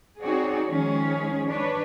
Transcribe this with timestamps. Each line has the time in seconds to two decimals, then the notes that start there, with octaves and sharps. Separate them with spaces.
0.22 C4 D#4 F#4 G#4 C#5 D5
0.69 D#3 F3 G#3 C#4 G#4
1.49 D4 B4 C#5